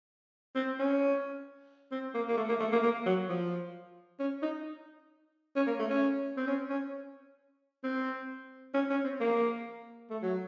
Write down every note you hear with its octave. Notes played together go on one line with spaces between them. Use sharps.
C4
C#4
C4
A#3
A#3
A3
A#3
A3
A#3
A#3
F#3
F3
C#4
D#4
C#4
A#3
A3
C#4
C4
C#4
C#4
C4
C#4
C#4
C4
A#3
A3
F#3